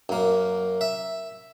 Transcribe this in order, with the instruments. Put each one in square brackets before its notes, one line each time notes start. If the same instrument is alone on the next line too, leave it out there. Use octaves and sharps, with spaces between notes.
[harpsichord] F#2 A#3
E5